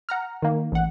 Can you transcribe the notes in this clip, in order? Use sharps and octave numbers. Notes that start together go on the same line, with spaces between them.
F#5 A#5 F6
D#3 A#3
A1 F#5